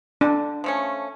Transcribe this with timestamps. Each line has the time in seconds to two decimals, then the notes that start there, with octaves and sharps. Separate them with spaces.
0.21 D3 D4
0.64 F3 A3 C#4